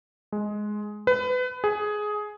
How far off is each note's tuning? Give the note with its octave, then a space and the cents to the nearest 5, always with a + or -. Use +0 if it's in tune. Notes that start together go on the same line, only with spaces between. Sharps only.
G#3 +10
B4 +30
G#4 +10